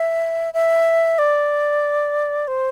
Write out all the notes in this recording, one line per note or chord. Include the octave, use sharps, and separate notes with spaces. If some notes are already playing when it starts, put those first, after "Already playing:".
Already playing: E5
E5
D5
C5